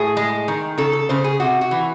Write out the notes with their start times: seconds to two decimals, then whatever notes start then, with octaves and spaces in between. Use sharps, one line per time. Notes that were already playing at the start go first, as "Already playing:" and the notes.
Already playing: A2 G#4
0.17 G#3
0.48 D#3
0.78 C#3 A4
0.93 A4
1.09 C#3 C5
1.24 G#4
1.40 C3 F#4
1.61 F#4
1.71 E3